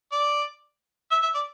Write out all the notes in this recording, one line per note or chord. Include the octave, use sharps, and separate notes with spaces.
D5
E5
E5
D5